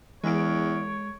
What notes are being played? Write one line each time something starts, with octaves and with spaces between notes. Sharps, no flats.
E2 E3 G#3 C#5 D7